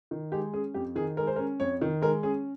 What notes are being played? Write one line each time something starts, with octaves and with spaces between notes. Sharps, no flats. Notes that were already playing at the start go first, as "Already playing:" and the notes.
D#3
G#3 G4
C#4 G#4
F2 G4
D#3 G#4
G#3 A#4
C5
C#4 A#4
F2 C#5
D#3
G#3 A#4
C#4 G#4